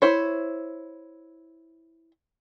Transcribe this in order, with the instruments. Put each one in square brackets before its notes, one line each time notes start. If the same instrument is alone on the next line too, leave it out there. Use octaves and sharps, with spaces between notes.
[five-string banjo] E4 C5 C#5